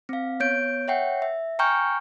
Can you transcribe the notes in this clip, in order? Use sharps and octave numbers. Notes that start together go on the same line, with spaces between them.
C4 F5
B3 C#5 G6 D7
C#5 E5 F#5 G5
E5
G5 G#5 A#5 C#6 F6 G6